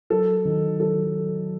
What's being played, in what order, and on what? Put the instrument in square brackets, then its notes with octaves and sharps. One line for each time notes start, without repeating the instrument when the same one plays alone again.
[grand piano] F#3 A4
D#3
F#3 A4